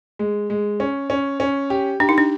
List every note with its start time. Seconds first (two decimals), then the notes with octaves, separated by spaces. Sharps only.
0.19 G#3
0.50 G#3
0.80 C#4
1.10 C#4
1.40 C#4
1.70 G4
2.00 D4 G4
2.09 D#4
2.18 D4